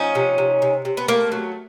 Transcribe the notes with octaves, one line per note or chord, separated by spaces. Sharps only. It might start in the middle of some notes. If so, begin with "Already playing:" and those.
Already playing: F3 C#4 D#4
C3
C3
C3
C3
B3
A3 A#3
F#3